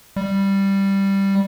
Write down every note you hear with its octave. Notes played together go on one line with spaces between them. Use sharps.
G3